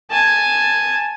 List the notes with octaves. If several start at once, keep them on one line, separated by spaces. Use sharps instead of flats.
G#5 A5